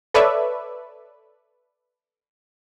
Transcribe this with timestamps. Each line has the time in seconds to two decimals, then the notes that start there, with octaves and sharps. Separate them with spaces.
0.14 A4 B4 C#5 D5 E5